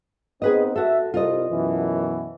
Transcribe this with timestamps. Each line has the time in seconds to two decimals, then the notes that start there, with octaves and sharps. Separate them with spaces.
0.42 B3 C4 D#4 G#4 B4 D#5
0.76 F#4 A4 E5
1.14 C2 F4 A#4 D#5
1.51 F#2 B2 E3